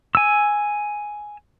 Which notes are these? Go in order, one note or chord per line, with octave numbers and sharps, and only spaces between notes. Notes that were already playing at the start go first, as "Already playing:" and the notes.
G#5 E6